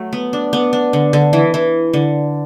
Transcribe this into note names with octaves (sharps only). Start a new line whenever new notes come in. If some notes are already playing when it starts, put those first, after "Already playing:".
Already playing: F#3 A3
B3
D4
B3
D4
D3
D3
E3
E3
D3